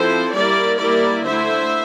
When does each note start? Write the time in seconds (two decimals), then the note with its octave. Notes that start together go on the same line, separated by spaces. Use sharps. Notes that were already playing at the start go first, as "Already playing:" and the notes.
Already playing: F3 C4 E4 A4 C5
0.34 G3 A#3 E4 A#4 D5
0.80 G3 A#3 E4 A#4 D5
1.25 D3 A3 E4 C5 E5